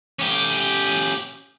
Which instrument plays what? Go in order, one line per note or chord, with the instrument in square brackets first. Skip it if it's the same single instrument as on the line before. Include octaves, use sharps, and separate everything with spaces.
[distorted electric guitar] C#4 G4